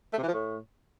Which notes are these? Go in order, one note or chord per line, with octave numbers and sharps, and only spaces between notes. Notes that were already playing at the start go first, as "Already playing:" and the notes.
A3
C3
E3
F3
A2